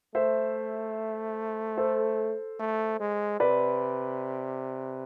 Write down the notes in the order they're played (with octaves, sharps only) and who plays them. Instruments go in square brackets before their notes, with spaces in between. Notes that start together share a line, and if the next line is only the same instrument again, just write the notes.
[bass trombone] A3 [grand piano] C5 E5
[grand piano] A4 C5
[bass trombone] A3
G#3
[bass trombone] C3 [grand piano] B4 D5